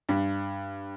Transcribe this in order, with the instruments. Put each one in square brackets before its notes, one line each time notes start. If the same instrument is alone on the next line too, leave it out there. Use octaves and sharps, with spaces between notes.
[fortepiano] G2